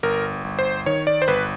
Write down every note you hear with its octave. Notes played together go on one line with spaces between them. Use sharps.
G1 A#4
G1
C5
D#3 C#5
D5
C5
G1 B4